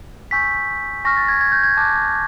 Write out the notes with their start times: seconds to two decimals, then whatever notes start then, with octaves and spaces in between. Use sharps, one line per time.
0.31 G#5 C#6 E6 G6 B6
1.04 G#5 C#6 F6 A#6
1.17 A6
1.28 G#6
1.41 G#6
1.52 G6
1.63 G#6
1.77 A5 D6 F#6